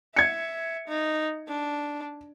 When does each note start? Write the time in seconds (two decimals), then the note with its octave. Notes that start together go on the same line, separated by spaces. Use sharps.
0.16 E5 G#6 C#7
0.88 D#4
1.48 D4